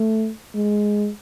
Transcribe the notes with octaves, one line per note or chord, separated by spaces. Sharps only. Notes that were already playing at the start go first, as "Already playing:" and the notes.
Already playing: A3
G#3